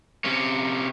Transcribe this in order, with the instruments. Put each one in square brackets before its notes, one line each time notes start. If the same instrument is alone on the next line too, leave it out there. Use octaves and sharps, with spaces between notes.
[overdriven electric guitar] C3 C#4